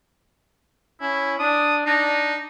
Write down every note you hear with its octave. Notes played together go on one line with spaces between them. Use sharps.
C#4 E4
D4 D#6
D4 D#4